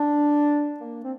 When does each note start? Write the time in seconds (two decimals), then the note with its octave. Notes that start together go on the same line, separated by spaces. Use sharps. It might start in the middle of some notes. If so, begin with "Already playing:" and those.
Already playing: D4
0.80 A#3
1.04 C4